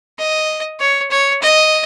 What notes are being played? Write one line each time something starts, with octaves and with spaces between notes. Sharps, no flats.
D#5
C#5
C#5
D#5